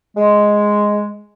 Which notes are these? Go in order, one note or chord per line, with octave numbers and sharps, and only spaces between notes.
G#3